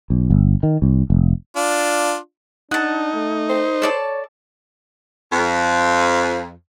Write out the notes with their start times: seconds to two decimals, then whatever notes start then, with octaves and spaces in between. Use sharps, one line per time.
0.10 B1
0.30 G1
0.63 D#3
0.82 C2
1.10 F1
1.56 D4 F4
2.71 D4 D#4 F#5 A5
3.13 A3
3.49 C5
3.82 A4 C#5 D5 A5
5.33 F2